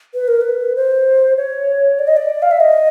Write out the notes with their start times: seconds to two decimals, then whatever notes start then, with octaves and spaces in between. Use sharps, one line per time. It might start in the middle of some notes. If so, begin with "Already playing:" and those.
0.14 B4
0.28 A#4
0.41 B4
0.76 C5
1.37 C#5
1.99 D5
2.08 D#5
2.17 D5
2.42 F5
2.51 E5
2.60 D#5